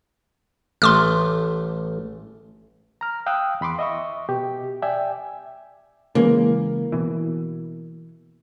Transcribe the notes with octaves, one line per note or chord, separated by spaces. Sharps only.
A1 A3 C6 D6 F6
A#5 F6
F5 G5 D#6 E6 F#6
E2 B5 C6 D6
D#5 E5 C#6
B2 G4
D5 E5 G5 G#5
C#3 E3 G#3 A#3
B2 E3